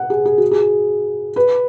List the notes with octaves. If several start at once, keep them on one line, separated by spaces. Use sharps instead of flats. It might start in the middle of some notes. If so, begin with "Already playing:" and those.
Already playing: F#5
G#4
G#4
F#4
G#4
B4